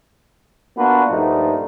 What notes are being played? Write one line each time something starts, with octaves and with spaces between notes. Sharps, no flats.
A#3 B3 D4 F4 F#4 B4
G2 A#2 F3 A3 D#4